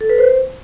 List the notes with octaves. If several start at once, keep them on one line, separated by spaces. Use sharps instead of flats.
A4
B4
C5